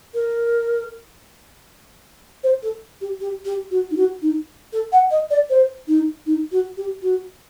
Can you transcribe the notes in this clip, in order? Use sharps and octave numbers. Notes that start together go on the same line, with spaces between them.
A#4
C5
A4
G4
G4
G4
F#4
D#4
F#4
D#4
A4
F#5
D#5
D5
C5
D#4
D#4
F#4
G4
F#4